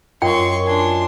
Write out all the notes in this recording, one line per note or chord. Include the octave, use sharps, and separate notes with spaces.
F#2 F4 A#4 D#5 G5 C6 C#6
D4 G#5 C6